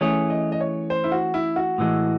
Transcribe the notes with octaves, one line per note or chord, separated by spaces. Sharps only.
E3 A3 C#4 G#4 C#5
D#5
D#5
C#5
C5
E4
F#4
E4
F#4
A2 E3 G#3